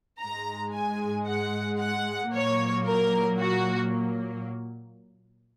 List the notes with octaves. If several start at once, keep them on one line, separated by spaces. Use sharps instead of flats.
G#2 G#3 A#5
G#5
F#5
F#5
A#2 F#3 A#3 C#5
A#4
F#4